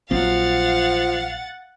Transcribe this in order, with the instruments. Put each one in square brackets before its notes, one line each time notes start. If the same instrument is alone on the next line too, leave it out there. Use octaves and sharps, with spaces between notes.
[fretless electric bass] A#1 F#3 C4 [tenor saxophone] F3 [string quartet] F5 [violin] F#5 A6